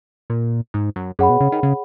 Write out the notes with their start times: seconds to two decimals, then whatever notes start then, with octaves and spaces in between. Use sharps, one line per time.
0.30 A#2
0.74 G#2
0.96 F#2
1.19 F#2 G#4 C#5 F#5 B5
1.29 B2
1.41 C#3
1.52 D#3
1.63 C#3